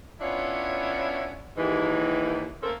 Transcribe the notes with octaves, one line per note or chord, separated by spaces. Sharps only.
B3 C#4 D4 E4 F4 C#5
D#2 G#2 E3
A3 A#3 C4 C#4 A4 A#4